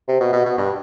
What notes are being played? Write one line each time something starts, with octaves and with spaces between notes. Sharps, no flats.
C3
B2
B2
B2
G2